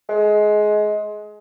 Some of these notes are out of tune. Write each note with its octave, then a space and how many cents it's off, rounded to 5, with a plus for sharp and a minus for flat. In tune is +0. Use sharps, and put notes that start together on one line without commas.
G#3 +20